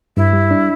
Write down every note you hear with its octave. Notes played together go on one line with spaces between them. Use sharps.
G2 E4
G3
D4